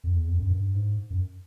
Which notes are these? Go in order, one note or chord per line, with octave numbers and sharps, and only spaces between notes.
F2
E2
F2
F#2
G2
G#2
F#2